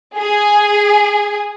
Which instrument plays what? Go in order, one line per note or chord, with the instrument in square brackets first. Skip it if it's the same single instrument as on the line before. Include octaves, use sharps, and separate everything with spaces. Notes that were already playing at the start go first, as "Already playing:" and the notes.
[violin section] G#4